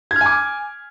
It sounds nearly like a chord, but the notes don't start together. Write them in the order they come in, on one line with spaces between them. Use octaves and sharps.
G#6 F6 G#5 D6